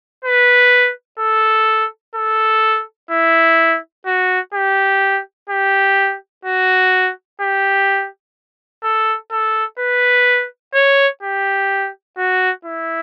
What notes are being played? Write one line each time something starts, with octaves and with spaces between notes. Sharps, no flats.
B4
A4
A4
E4
F#4
G4
G4
F#4
G4
A4
A4
B4
C#5
G4
F#4
E4